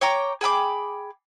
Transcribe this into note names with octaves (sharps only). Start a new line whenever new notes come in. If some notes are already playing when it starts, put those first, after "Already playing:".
C#5 G5 A#5 D6
G#4 G5 B5 D6